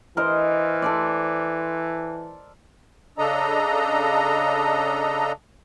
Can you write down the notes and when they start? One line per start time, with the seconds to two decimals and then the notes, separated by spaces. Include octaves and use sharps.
0.17 E3 A#4 C5 D#5
0.82 A4 C5 D5
3.18 C#3 D4 A4 D#5 A#5